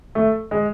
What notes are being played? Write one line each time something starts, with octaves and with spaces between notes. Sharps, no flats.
A3
G#3